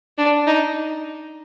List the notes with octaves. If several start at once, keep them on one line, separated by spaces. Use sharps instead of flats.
D4
D#4